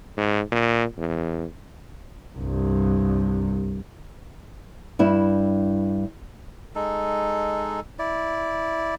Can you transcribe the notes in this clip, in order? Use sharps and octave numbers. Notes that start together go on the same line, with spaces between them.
G#2
A#2
E2
C2 G2
G2 E4 E5
G#3 D#4 A4
E4 D5